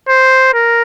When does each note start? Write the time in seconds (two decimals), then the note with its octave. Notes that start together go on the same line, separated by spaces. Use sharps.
0.08 C5
0.54 A#4